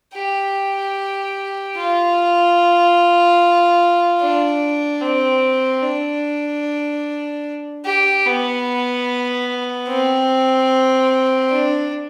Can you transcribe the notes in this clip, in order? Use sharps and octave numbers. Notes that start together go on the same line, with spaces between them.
G4
F4
D4
C4
D4
G4
B3
C4
D4